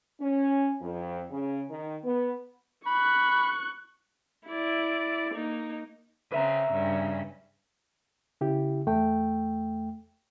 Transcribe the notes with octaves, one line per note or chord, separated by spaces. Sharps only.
C#4
F2
C#3
D#3
B3
B5 C#6 F#6
E4 D5
A#3 D#4
C#3 C4 B4 E5 A#5
G2 C#3
C#3 E4 G4
E2 A3 G5